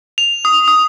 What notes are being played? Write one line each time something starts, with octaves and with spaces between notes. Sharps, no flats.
F7
D#6
D#6